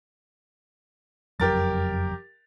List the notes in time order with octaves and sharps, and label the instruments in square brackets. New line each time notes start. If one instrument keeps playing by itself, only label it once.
[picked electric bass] F#1 F2 F#3 [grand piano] G4 A#4 A6